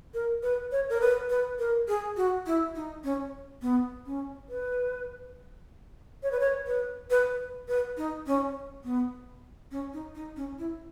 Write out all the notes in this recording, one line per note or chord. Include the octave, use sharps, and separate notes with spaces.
A#4
B4
C#5
A#4
B4
B4
A#4
G#4
F#4
E4
D#4
C#4
B3
C#4
B4
C#5
B4
C#5
B4
B4
B4
D#4
C#4
B3
C#4
D#4
D#4
C#4
E4